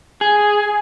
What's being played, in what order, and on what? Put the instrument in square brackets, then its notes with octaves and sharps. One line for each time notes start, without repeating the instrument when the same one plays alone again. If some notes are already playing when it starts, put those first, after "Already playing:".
[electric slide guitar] G#4